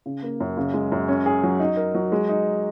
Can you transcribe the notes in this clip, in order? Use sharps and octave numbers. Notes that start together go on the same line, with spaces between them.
C#3
A#3
F#2
C#3
G#3
F#2
C#4
G#4
F#3
D#4
A#4
F#3
G#3
D#4